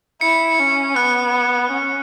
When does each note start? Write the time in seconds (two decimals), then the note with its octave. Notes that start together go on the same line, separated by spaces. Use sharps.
0.21 E4 C#7
0.59 C#4
0.96 B3 F#6
1.71 C#4